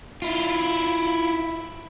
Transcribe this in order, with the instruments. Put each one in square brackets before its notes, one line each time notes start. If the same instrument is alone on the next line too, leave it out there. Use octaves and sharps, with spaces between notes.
[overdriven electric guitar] E4 F4